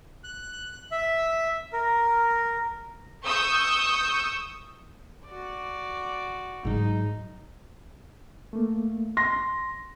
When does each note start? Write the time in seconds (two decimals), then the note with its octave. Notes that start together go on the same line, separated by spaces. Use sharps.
0.24 F#6
0.91 E5
1.73 A#4
3.25 C#6 D#6 E6 G6
5.25 F#4 D5
6.65 G#2 F#3 D#4
8.53 A3 A#3
9.17 C6 A#6